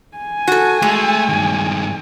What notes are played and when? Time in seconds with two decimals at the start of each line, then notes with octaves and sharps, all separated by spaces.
0.17 G#5
0.48 F#4 A4
0.82 G#3 A3
1.29 G2 D#3